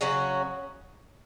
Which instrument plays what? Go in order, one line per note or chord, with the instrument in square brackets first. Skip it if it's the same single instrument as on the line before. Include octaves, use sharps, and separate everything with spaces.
[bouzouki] C#3 F#3 C#4 F#4